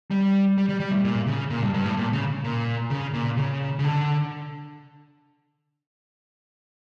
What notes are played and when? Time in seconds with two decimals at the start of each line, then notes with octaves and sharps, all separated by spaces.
0.11 G3
0.58 G3
0.69 G3
0.80 G3
0.92 A2
1.04 A#2
1.27 C#3
1.50 A#2
1.62 G2
1.74 G2
1.85 A2
1.97 A#2
2.13 C#3
2.44 A#2
2.90 C#3
3.13 A#2
3.37 C#3
3.79 C#3
3.84 D3